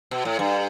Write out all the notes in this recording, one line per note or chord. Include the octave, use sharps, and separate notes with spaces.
B2
A2
G2